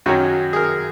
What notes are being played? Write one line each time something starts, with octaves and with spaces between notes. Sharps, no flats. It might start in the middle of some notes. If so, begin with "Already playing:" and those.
F#2 D#3 F#3 C#4 F#4
G#4
A#4